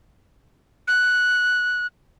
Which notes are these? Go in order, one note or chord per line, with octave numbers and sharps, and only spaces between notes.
F#6